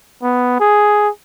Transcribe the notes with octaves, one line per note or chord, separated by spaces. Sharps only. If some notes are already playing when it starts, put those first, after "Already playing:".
B3
G#4